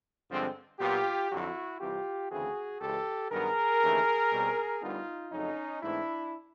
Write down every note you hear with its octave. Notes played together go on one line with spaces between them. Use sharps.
G2 D3 F3 G#3 C4
A#2 F#3 B3 F4 G4
F2 D3 F#3 E4 F#4
C2 C3 E3 G3 F4 G4
D2 C#3 E3 A3 C4 F#4 G#4
C#2 C#3 E3 G#3 G4 A4
G2 D#3 F#3 B3 G#4 A#4
D#2 C#3 E3 A3
B2 G3 C4
D2 D3 G3 B3 D#4 F4
F2 C#3 F#3 A3 C#4 D#4
G#2 E3 A3 C4 D4 E4